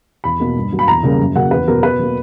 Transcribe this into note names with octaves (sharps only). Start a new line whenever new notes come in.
E2 B5
B2 A#3
G2
F#3 A#3
B5
E2 A#5
C#3 G3 A#3
F#2
C#3 F#3 A#3 F#5
E2 B4
B2 F#3 A#4
B2 B4
F#3 A#3